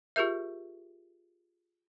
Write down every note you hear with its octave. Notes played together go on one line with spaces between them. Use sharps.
F4 G4 G#4 A#4 E5